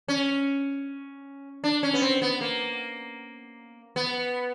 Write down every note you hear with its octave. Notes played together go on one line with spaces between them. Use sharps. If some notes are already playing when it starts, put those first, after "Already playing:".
C#4
D4
C#4
B3
C4
B3
A#3
B3